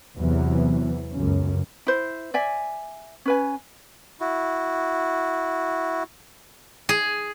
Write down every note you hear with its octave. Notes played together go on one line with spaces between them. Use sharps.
E2 C3 E3 F#3 B3
C#2 F#2 C#3 C#4
E4 C5
D5 E5 G#5
C#4 B4 G#5
E4 F#4
G#4